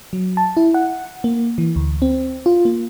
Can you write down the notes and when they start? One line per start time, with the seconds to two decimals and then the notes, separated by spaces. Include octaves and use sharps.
0.13 F#3
0.37 A5
0.57 E4
0.74 F#5
1.24 A#3
1.58 E3
1.76 D2
2.02 C4
2.46 F4
2.65 A#3